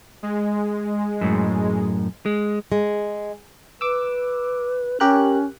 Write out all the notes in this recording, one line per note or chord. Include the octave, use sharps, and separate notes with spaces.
G#3
F#2 A2
G#3
G#3
B4 D6 E6
C#4 G4 A#4 F#6